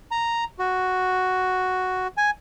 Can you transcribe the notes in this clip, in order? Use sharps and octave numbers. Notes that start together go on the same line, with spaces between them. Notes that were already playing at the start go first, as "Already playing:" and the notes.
A#5
F#4
G#5